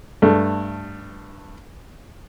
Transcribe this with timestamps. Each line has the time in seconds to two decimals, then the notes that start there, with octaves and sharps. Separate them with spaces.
0.22 G2 A3